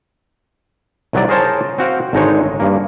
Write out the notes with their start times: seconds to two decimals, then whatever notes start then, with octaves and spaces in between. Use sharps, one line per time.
1.13 C2 D#3 F#3 F#4 D5
1.29 G#4 A#4 C5 C#5 A5
1.78 C4 F#4 F5 G5
2.13 G#1 D3 G#3 D#4 C5 C#5
2.60 G2 A#3